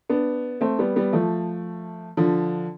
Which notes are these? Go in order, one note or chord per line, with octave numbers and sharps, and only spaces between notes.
B3 D4
A3 C4
G3 B3
G3 B3
F3 A3
D3 F3